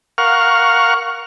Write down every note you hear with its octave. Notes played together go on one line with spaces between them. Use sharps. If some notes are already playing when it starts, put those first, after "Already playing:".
A#4 F5 F#5 C#6 F6